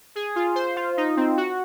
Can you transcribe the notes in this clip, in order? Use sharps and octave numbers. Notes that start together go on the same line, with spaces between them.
G#4
F4
C5
F4
D#4
C4
F#4